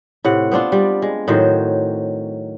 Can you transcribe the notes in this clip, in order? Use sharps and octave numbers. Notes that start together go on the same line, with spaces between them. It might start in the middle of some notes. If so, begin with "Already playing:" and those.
A2 C3 F#5
B3 C4 D4 F4
G3 D5
G#3
A2 D#3 F#3 C5